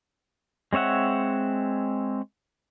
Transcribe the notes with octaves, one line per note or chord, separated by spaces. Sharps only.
G#3 C4 C#5 E5 F#5